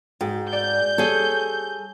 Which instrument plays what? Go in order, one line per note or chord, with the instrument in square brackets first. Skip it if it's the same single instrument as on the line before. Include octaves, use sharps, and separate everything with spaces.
[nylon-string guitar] G#2 [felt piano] F#4 G#4 G5
[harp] D5 [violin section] G6
[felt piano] G3 [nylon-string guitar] G#4 A4 [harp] C#5